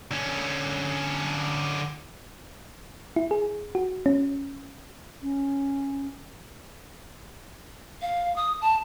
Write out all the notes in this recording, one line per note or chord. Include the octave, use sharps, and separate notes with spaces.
D3 C#4
E4
G#4
F#4
C#4
C#4
F5
D#6
A5